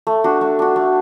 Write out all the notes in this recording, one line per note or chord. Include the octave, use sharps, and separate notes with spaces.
A3
D4 F#4
A3
D4 F#4
A3